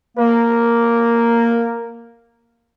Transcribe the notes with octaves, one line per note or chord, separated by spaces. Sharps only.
A#3 A#4